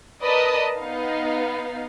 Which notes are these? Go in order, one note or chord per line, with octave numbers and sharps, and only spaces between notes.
A#4 B4 D5 D#5 A5 D#6
B3 D#4 F5